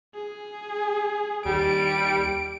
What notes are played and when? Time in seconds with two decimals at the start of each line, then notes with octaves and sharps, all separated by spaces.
0.15 G#4
1.45 D#2 G3 G4 D7